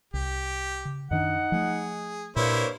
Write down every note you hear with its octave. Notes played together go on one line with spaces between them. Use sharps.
C2 G4
C#3
F#2 D#3 D4 D#4 F#5
F3 A3 G#4
G2 A#2 A#3 E4 C5 C#5